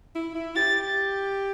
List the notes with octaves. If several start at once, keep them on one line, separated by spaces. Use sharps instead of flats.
E4
E4
G4 A6